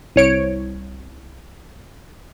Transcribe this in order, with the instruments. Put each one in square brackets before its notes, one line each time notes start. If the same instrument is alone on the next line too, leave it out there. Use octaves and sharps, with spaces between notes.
[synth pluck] C2 C#5 D7